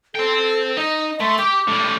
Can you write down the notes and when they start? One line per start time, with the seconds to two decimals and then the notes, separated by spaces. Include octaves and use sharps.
0.15 A4 C5 G5
0.77 D#4 D#5
1.20 A3 C6
1.39 G4 D6
1.67 A2 G3